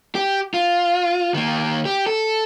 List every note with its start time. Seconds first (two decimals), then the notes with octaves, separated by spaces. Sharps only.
0.15 G4
0.54 F4
1.34 D#3 A#3
1.85 G4
2.06 A4